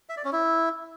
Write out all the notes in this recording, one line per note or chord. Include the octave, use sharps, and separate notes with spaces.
E5
D5
C#4
E4